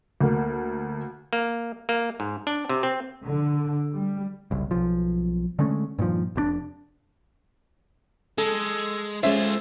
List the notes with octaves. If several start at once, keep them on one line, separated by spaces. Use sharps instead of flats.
D2 A#3
A#3
A#3
G#2
D4
C3
C4
D3
G3
F#1 C2
B1 F3
D3 G#3 A3 C#4
G2 A#2 D#3 F3
F1 A2 D4
G#3 A4
G#3 C#4 F4 G#4 A4 C5 E5